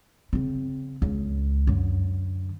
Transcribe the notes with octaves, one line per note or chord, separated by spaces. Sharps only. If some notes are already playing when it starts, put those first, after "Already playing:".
C#3 C4
C#2
F#2 D3